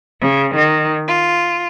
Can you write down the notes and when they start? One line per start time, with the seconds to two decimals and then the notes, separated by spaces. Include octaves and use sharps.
0.20 C#3
0.53 D#3
1.08 F4